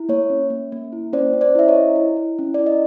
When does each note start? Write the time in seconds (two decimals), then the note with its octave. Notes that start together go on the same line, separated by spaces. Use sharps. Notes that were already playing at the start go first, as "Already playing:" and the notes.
Already playing: E4
0.09 A#3 C#5
0.30 C#4
0.50 A#3
0.72 A#3
0.92 E4
1.13 C#4 C5 D5
1.33 C#4
1.41 C5 D5
1.55 E4 E5
1.68 C#5 D#5
1.75 E4
1.96 E4
2.17 E4
2.39 C#4
2.54 E4 D5
2.66 D#5